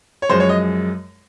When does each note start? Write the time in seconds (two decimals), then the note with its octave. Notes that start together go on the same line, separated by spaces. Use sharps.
0.22 C#5
0.30 F#2 F3 G#3 C5
0.40 C#5
0.49 D#5